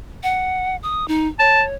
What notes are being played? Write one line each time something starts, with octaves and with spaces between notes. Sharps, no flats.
F#5
D#6
D#4
C#5 A5